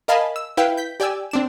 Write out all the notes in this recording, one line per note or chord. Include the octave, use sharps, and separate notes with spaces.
A#4 D#5 F5 G#5 A5 B5
E6
E4 B4 F5 G5
G6 B6
G4 D5 G5 G#5 E6
C4 D4 E7